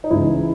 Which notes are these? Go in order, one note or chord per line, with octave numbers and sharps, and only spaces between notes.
D#4
C#2 C#3 E3 E4